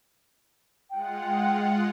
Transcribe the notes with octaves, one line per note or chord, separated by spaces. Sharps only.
G#3 F4 F#5 G5